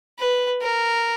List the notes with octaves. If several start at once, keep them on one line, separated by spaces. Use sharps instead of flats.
B4
A#4